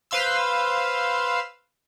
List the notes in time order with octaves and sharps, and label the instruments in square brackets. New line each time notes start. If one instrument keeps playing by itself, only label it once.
[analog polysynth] B4 C5 F5 C6 E6